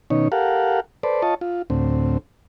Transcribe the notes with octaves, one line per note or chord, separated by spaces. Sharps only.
B2 D#3 C#4 D#4 C#5
G4 A4 A#4 F5 F#5
A4 B4 C5 D5
F4 C#5 D#5 A5
F4
D2 A2 C4